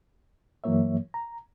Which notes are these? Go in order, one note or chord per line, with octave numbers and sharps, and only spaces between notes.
G2 E3 F#3 A#3 C#5 E5
A#5